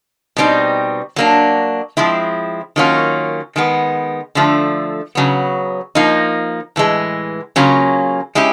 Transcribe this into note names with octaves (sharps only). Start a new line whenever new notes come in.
B2 G3 C4 D#4
F#3 A#3 D4
F3 G#3 C4 E4
D#3 F#3 A#3 C#4 F4
D#3 G#3 B3
D3 F3 A3
C#3 F#3 B3
F3 A#3 D#4
A2 E3 G#3
C#3 F#3 A#3 C#4 F4
G#3 C#4 E4 G4